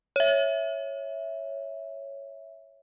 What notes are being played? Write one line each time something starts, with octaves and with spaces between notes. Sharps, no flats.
C#5 E5